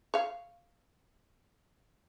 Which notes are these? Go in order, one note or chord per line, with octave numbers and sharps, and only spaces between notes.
C#5 F5